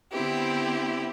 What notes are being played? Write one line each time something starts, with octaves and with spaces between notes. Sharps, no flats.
D3 B3 C4 E4 G4